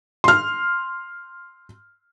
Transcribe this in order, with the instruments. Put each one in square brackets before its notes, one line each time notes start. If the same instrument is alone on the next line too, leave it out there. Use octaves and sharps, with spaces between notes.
[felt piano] C6 F6